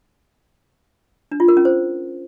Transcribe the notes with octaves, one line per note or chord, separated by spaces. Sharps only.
D4
F4
A#4
C#4
C5